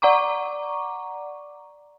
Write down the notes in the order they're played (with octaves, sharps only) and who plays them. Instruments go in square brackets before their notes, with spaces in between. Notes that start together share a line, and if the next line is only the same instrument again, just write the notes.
[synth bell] D5 F#5 A#5 C#6 D6